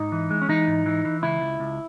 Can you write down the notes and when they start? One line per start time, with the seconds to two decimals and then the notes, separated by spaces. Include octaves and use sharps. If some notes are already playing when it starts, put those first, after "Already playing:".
Already playing: G#2 D#4
0.12 E3
0.30 G#3
0.42 C#4
0.49 E3 D#4
0.67 G#2
0.86 E3
1.05 E3
1.22 C#2 E4
1.41 C#2
1.60 C#2